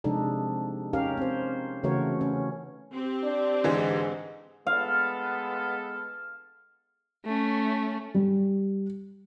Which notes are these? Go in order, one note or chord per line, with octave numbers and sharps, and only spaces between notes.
C3 F3 G#3 D4 D#4 A4
C#4 D#4 G4 A#4 F5
C4 C5
C#3 E3 A3 F#4 A#4 C#5
C#4
C4 G4
D4
G#2 D3 E3 G#3
G#3 B3 A4 F5
A3 C#4
G3